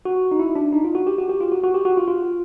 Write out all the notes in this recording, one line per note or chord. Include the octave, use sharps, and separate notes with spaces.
F#4
D#4
E4
D4
D#4
F4
F#4
G4
F#4
G4
F4
F#4
F#4
G4
F#4
F4
F4